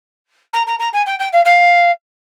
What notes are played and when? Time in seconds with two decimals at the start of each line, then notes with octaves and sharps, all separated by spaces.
0.53 A#5
0.67 A#5
0.79 A#5
0.93 G#5
1.06 G5
1.19 G5
1.33 F5
1.45 F5